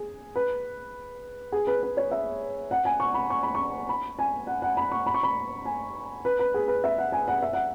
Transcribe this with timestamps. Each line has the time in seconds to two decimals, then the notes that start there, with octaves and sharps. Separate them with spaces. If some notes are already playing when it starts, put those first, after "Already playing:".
Already playing: G#4
0.36 B4
1.52 G#4
1.67 B4
1.83 B4
1.97 C#5
2.11 E5
2.71 F#5
2.85 G#5
3.00 C#6
3.14 B5
3.30 C#6
3.43 B5
3.55 C#6
3.89 B5
4.19 G#5
4.47 F#5
4.62 F#5
4.77 B5
4.92 C#6
5.06 B5
5.14 C#6
5.23 B5
5.65 G#5
6.25 B4
6.39 B4
6.54 G#4
6.68 B4
6.84 E5
6.98 F#5
7.12 G#5
7.28 F#5
7.42 E5
7.53 F#5